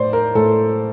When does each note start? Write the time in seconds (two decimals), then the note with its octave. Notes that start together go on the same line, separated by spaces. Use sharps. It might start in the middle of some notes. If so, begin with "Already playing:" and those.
Already playing: A2 C5 D5
0.13 A#4
0.35 A2 A4